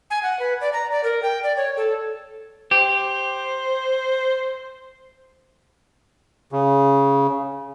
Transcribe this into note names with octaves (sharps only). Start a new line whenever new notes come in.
G#5
F#5
B4
D5
A#5
D5
A#4
G5
D5
C#5
A4
G4 C5
C#3